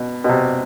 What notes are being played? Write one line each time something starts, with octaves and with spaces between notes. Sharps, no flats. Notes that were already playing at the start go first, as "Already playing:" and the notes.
Already playing: B2
B2
C3